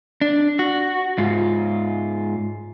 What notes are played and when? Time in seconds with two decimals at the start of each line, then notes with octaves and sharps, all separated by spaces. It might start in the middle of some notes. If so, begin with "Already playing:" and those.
0.21 D4
0.59 F#4
1.18 G#2 F4